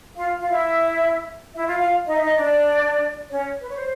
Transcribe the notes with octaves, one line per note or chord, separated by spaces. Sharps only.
F4 F5
F4 F5
E4 E5
E4 E5
F4 F5
F4 F5
D#4 D#5
E5
D#4 D#5
D4 D5
C#4 C#5
B4
C#5
C5